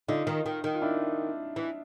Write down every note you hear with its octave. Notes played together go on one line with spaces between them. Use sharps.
D3 D#4 F4
D#3
D#3
D#3
F4
D4 E4
E3